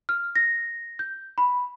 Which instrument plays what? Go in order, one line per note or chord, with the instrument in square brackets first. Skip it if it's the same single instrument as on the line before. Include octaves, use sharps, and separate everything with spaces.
[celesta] F6
A#6
G6
B5